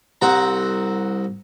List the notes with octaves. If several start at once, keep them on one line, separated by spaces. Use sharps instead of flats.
C2 C4 F#5 A#5